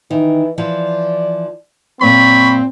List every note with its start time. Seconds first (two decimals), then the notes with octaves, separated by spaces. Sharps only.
0.11 D#3 E3
0.58 E3 F3 D5
2.01 F#2 A#2 A#3 C4 B5 C#6